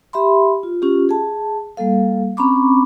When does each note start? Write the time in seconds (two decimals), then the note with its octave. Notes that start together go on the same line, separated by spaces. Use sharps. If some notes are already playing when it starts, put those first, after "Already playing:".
0.13 G4 E5 B5 C6
0.63 F4
0.82 C#4 F4 G4
1.09 G#4 A5
1.77 G3 A#3 A4 F5
2.37 C4 C#4 A#5 B5 C#6 D6